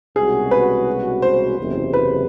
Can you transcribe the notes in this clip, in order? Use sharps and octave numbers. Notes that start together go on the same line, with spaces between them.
C2 B2 G#3 C#4 F#4 G#4
B4
C5
F#1 E2 C3
B4